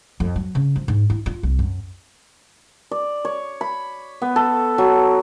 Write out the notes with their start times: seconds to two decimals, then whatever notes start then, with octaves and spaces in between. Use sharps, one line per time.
0.20 F2
0.36 F#3
0.55 C#3
0.76 F3
0.88 G#2
1.10 E4
1.26 F4
1.43 C2
1.59 F#2
2.91 D5
3.25 C#5
3.61 B5
4.22 B3
4.36 A4
4.78 F#3